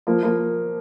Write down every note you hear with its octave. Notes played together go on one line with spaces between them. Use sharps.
F3 A#3
F3 A#3